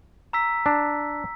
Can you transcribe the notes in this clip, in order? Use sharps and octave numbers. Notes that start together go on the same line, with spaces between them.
A#5 E6 B6
D4